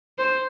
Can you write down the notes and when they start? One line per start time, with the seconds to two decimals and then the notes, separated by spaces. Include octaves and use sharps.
0.18 C5